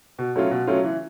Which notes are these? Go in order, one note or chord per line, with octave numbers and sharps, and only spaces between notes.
B2
F#3 A3 C#4 F4
B2
F#3 A3 C#4 F4
E3